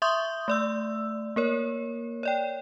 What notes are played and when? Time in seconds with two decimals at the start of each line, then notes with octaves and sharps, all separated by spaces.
0.02 E5 C6 C#6 D#6 G6
0.48 A3 D5 E6
1.36 A#3 A#4 C#5
2.23 C#5 D5 G5